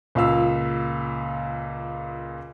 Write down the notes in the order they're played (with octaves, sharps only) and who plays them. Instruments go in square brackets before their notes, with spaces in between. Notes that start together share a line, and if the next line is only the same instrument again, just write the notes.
[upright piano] C#2 A#2 F5 E6